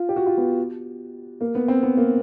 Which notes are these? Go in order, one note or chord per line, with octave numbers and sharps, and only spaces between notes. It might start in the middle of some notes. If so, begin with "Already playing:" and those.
Already playing: F4
G4
F#4
F4
B3
A#3
B3
C4
B3
A#3